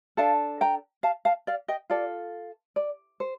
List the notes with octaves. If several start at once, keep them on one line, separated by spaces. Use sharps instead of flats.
D4 A4 F5 A5
G5 A#5
F5 A5
F5 A5
D5 F5
D#5 G5
F4 A4 D5
D5
C5